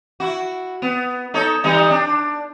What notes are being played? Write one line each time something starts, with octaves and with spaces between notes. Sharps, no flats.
E4 F#4
B3
D#4 A4 C#5
E3 G3 D#4
D4